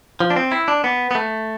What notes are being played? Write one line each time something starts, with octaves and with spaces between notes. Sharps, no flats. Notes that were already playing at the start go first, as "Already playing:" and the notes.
F3
D4
C4
E4
D4
B3
B3
A3